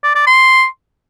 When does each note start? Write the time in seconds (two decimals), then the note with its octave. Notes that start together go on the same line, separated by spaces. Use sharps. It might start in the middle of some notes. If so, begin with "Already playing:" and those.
0.03 D5
0.15 D5
0.27 C6